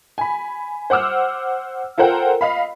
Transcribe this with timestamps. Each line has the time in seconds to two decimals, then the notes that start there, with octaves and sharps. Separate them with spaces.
0.18 G#5 B5
0.90 C5 F#5 D6 E6 F6
1.98 F4 A4 A#4 C5 F#5 G5
2.41 D#5 F5 B5